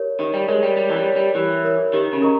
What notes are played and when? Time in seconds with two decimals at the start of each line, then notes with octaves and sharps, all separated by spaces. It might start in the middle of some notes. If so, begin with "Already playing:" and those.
Already playing: G4 A#4 C#5
0.20 D#3 G4
0.34 G3
0.48 G#3 A#4 C#5
0.63 G3
0.77 G3 G4
0.90 E3
0.97 G3
1.06 A#4 C#5
1.16 G3
1.35 E3 G4
1.64 A#4 C#5
1.93 D#3 G4
2.13 C#3
2.22 A#4 D#5 A#5 C#6